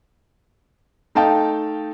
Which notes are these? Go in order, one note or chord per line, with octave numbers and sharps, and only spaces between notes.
A3 D#4 F5 G5 A5